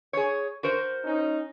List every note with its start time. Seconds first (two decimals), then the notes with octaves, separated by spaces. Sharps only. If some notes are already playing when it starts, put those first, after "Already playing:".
0.13 G#4 C#5
0.63 F#4 A#4 C5
1.05 C#4 D#4